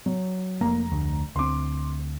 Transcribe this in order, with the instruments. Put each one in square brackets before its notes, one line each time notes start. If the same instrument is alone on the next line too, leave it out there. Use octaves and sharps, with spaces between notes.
[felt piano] F#3
[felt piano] F1 A#5 [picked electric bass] A#3
[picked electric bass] D2
[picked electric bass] D2 C4 [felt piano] C6 D6